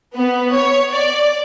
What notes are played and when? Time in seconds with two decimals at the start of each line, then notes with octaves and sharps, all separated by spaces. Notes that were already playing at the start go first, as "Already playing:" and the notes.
0.16 B3
0.56 C#5
0.93 D5